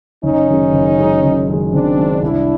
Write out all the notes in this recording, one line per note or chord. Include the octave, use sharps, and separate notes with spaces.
F#1 C#4 D#4
F#2 D#3 G#3
F#1
F#2 D#3 G#3
F#1
F#2 D#3 G#3
F#1 C4 D4
F#2 D#3 G#3
C2 D4 E4